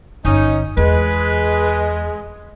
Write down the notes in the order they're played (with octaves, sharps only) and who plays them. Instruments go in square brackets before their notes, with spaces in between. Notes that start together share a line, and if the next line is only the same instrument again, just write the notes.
[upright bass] G1 [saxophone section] C#4 D#4
[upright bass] E2 [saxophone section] G#3 [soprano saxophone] B4